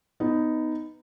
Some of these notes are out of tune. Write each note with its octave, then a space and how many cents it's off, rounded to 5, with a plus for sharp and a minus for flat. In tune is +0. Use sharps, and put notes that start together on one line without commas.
B3 +15 D#4 +0